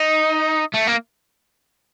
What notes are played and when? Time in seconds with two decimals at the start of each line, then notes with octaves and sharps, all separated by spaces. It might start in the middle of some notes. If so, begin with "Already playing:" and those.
Already playing: D#4
0.74 A3
0.87 A#3